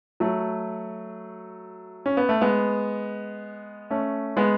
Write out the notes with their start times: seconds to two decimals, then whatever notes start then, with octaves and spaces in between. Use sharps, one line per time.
0.20 F#3 A3
2.06 C#4
2.17 B3
2.29 A3
2.41 G#3 B3
3.91 A3 C#4
4.37 G#3 B3